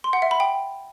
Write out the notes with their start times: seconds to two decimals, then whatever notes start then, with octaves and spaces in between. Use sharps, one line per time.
0.04 C6
0.13 F#5
0.22 E5
0.31 B5
0.40 G5